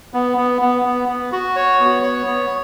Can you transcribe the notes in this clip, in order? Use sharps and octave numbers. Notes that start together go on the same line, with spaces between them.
B3
B3
B3
B3
B3
F#4
C#5
B3
C#5
B3